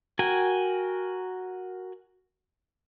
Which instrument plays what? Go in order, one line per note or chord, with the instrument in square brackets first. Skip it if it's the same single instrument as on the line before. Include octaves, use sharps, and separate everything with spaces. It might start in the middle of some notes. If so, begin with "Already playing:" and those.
[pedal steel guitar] F#4 A#4 G5 G#5